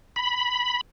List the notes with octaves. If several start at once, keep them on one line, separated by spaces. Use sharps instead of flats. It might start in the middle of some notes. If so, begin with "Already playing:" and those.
B5